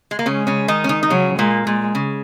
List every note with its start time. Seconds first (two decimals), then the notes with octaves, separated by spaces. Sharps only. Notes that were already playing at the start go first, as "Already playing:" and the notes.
0.11 G#3
0.19 A#3
0.26 C#3 G#3 C#4
0.47 C#3 C#4
0.68 D#3 D#4
0.84 C#4
0.89 D#3 D#4
1.03 D#4
1.10 C#3 F#3 C#4
1.38 A#2 G#3 A#3
1.66 A#2 G#3
1.95 C#3